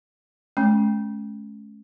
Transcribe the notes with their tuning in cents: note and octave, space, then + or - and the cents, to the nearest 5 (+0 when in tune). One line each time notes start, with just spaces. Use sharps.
G#3 +45 C#4 +0